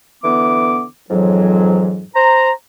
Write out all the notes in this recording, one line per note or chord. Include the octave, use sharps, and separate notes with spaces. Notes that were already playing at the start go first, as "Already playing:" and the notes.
D3 E3 B3 D6
F2 G#2 E3 F#3
C5 A#5